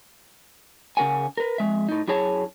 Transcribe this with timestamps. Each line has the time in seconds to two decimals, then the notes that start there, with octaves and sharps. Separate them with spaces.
0.97 C#3 C4 A#4 F#5 G#5
1.37 A#4 B4
1.58 F2 G#2 G#3 E5
1.89 A2 D#4
2.08 F#2 E4 G#4 C#5 A5